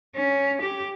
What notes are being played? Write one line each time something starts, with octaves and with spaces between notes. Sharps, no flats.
C#4
G4